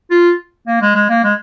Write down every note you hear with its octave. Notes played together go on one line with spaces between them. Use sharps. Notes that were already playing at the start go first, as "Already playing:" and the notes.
F4
A#3
G#3
G#3
A#3
G#3